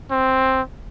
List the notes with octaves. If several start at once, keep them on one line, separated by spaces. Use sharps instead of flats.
C4